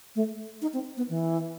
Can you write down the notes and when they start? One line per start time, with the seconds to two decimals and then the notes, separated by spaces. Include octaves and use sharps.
0.16 A3
0.62 D#4
0.74 C4
0.97 B3
1.09 E3